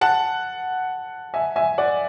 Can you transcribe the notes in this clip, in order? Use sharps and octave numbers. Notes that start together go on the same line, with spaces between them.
F#5 A5
E5 G#5
E5 G#5
D5 F#5